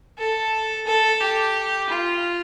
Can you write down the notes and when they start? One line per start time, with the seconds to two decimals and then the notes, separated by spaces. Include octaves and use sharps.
0.18 A4
0.86 A4
1.20 G4
1.89 F4